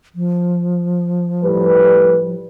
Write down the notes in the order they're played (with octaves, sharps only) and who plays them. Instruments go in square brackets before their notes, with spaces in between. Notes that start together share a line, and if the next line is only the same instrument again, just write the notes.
[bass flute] F3
[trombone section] A2 G3 B4